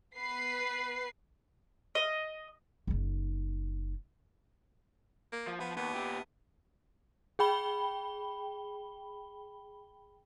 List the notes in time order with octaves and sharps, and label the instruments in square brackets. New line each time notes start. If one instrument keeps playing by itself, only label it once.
[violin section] B3 B4 C7
[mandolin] D#5
[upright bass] F#1 D#4
[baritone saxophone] A#3
[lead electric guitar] F3
[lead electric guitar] F3 [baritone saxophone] B3
[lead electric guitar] D#2 [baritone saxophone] B3
[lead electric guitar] A#2 G4
[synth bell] G#4 G5 B5 G7